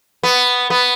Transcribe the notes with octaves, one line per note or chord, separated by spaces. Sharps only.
B3
B3